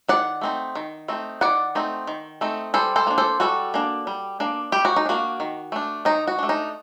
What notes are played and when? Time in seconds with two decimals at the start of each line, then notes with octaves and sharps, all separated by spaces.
0.08 D#3 D5 F#5
0.41 A3 C4 D#4
0.75 D#3
1.08 A3 C4 D#4
1.41 D#3 D5 F#5
1.75 A3 C4 D#4
2.07 D#3
2.41 A3 C4 D#4
2.74 G3 A4 C5
2.96 A4 C5
3.07 A#3 D4
3.18 A4 C5
3.40 G3 F#4 A4
3.74 A#3 D4
4.07 G3
4.40 A#3 D4
4.72 G3 G4
4.85 F#4
4.96 D#4
5.06 A#3 D4 F#4
5.40 D#3
5.72 A3 D4
6.05 D#3 D#4
6.27 F#4
6.39 A3 D4
6.49 D#4